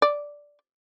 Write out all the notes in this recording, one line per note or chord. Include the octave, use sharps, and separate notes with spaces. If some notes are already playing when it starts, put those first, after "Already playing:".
D5